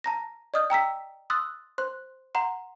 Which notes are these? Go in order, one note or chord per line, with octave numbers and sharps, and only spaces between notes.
A5 A#5 A#6
D5 D#5 D#6 F6 G6
G5 A#5 E6 B6
C6 D#6 E6 F#6 A6
C5 C6 F#6
F#5 A#5 C6